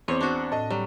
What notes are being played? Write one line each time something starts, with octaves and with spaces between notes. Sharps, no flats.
E2 C4 C5 C#5 D6
D4 F#4
A2 D#5 A5
F#3 G3